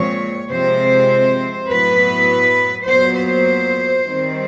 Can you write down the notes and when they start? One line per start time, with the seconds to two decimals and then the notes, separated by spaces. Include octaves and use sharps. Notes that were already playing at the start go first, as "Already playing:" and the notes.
Already playing: A#2 F3 G#3 C4 C#5
0.50 C3 F3 G#3 C4 C5
1.67 A2 F#3 B3 B4
2.85 A#2 F#3 B3 C5
3.14 C5
4.02 D#3 G3 C4